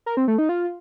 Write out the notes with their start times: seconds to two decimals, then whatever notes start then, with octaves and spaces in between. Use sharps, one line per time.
0.06 A#4
0.17 C4
0.28 A3
0.38 D#4
0.49 F4